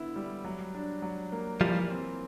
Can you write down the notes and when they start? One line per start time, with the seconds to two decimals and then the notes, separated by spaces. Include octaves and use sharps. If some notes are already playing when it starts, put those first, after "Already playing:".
Already playing: D3 B3 E4
0.16 G3
0.44 F#3
0.74 D4
1.02 F#3
1.32 A#3
1.61 E3 F3 G3
1.90 C4